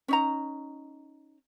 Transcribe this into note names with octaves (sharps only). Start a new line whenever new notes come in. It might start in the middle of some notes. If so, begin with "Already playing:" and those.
C#4 D#4 A#5